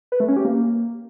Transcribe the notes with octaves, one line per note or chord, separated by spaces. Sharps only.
B4
A3
C#4
G4
A#3